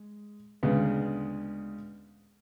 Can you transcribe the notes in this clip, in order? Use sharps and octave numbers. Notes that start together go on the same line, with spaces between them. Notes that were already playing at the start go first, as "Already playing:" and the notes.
Already playing: G#3
D2 C#3 G#3 B3